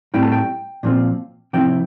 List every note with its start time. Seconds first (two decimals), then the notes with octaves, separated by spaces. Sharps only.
0.14 A2 G3 C4 E4 G5
0.23 A5
0.32 G5
0.83 A#2 F3 C4 F4
1.53 C3 F3 C4 E4 G5